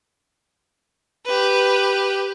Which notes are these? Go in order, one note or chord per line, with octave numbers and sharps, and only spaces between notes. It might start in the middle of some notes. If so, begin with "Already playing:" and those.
G4 B4